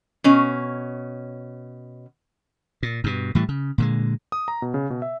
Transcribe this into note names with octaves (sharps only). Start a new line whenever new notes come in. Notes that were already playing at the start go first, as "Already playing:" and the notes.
B2 C#4
A#2
G2 B2
A2 E3 G3
C#3
A#2 D3 G#3
D#6
A#5
B2
C#3
B2
E5